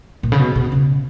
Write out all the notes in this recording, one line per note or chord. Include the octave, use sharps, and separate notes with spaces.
A#2
C#3
B2
B2
C#3